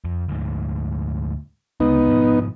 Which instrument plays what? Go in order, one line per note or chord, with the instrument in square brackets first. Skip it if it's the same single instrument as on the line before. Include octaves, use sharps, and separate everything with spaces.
[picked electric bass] F2
D2 G#2
[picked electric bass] D2 C#3 G#3 [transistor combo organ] B3 D#4
[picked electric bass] G#2 B2 F3